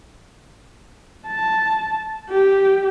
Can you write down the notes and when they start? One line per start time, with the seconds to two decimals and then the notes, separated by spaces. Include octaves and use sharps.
1.27 A5
2.30 G4